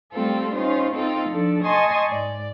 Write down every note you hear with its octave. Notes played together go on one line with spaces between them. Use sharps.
G3 A3 C4 F4 A4
C#4 D#4 F4 C5
C4 D#4 F4 A4
F3 D4 A4
D#5 G#5 A5 C6 C#6 D#6
G#2 D5